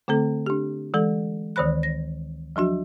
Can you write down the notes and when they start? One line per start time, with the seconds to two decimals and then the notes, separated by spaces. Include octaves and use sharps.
0.08 D3 A3 C4 A4
0.46 D4 G4
0.94 E3 G#3 A4
1.56 D2 D#3 E3 C5 B5 F#6
1.83 A#6
2.56 F3 F#3 D4 F#4